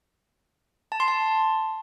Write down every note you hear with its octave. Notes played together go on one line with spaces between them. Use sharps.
A5
C6
A5